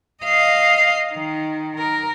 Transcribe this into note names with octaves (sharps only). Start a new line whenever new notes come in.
D#5 F5
D#3
A#4